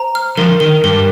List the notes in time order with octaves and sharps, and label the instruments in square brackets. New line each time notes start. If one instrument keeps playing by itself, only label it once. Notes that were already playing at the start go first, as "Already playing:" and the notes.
Already playing: [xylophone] C5 A#5
F6
[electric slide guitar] D3 F3 [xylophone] A#4
[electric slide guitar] D#3 [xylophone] A#4
[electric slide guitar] G2 [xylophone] A#4